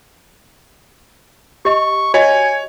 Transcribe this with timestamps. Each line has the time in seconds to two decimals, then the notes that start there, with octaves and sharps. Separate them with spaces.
1.65 G4 D#5 C#6
2.14 F#4 C#5 D#5 G#5